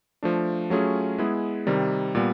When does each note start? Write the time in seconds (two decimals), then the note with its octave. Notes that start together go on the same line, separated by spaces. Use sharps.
0.23 F3 A3 D4
0.70 F#3 A3 C#4 F4 G#4
1.18 G#3 B3 E4 G#4
1.67 C3 D#3 G3
2.15 A#2 G3 B3